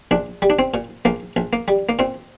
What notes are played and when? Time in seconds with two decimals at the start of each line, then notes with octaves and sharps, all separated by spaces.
0.11 A#1 D4
0.42 G3
0.50 D4
0.59 C4
0.74 A#2
1.05 A#1 A#3
1.36 A#1
1.53 A#3
1.68 G3
1.89 A#3
1.99 A#2 C4